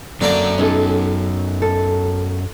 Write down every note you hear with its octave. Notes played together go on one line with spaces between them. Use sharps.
F#2 D3 F#3 A#3 C4 D5 A#5
B1 C#4 G#4 A4
A4